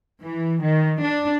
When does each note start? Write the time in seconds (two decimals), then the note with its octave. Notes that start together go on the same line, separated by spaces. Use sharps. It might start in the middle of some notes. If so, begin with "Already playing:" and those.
0.23 E3
0.63 D#3
1.03 D4